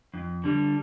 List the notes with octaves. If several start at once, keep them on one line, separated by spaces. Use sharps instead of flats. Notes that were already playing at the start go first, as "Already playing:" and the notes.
F2
D3 G3